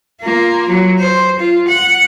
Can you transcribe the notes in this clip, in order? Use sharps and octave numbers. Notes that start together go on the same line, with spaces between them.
A#3 F4
F#3
C5
F4
F#5